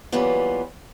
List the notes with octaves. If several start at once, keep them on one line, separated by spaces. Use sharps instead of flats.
E3 F#3 G3 A#3 B3 F4